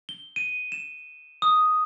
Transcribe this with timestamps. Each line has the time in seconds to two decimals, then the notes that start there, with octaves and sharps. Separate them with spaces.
0.09 G7
0.36 D#7
0.72 E7
1.42 D#6